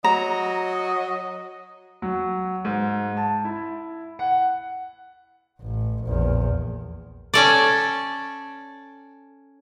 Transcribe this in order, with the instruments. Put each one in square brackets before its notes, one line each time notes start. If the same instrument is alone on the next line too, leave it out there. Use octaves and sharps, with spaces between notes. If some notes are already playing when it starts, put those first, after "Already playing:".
[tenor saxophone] F#3 [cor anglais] D#5 [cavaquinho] A#5
[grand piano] F#3
G#2
A5
E4
F#5
[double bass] A1
A#1 E2
[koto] C#4 A4 D5